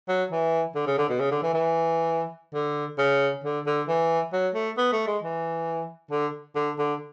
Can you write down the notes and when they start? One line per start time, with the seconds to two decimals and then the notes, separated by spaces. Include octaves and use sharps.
0.09 F#3
0.31 E3
0.75 D3
0.87 C#3
0.98 D3
1.09 B2
1.20 C#3
1.31 D3
1.43 E3
1.54 E3
2.54 D3
2.98 C#3
3.44 D3
3.66 D3
3.88 E3
4.33 F#3
4.55 A3
4.78 B3
4.92 A3
5.07 G#3
5.22 E3
6.11 D3
6.55 D3
6.79 D3